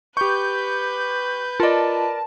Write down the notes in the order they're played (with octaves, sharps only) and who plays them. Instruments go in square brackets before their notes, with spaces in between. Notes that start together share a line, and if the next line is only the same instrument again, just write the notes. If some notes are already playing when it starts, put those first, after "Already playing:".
[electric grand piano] G4 C#6 [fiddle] B4 [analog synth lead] G6
[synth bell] F4 D#5 [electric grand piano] A#4 D5 [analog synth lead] A5